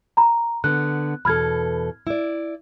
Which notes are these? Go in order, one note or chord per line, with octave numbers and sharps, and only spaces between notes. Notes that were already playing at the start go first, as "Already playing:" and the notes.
A#5 B5
D3 B3 F#6
E2 B2 A4 B5 F6 G#6
E4 D5